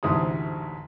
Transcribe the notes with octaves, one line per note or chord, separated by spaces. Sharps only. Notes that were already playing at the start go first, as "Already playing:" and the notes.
A1 D2 G#2 C3 G#3 D#6